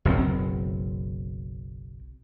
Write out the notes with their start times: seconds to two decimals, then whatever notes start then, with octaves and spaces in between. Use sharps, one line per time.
0.05 F#1 B1 C#3 C4